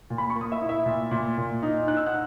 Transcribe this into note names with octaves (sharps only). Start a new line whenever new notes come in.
A#2
B5
C#6
A#3
D#6
E5 E6
E4
E5 E6
A#2
A#2
A#2
D#4
D#4 F#6
E6
F#5 F#6